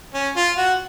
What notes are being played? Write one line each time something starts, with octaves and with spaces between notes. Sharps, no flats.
C#4
F4
F#4